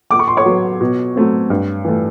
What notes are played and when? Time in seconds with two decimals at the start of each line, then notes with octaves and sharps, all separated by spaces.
0.11 A#2 D6
0.19 C#6
0.28 C6
0.37 C#5 C#6
0.46 F#3 B3
0.81 B2
1.16 F#3 A3 C4
1.50 G2
1.85 E3 A3